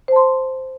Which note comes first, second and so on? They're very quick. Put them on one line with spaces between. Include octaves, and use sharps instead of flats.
C5 A5 C6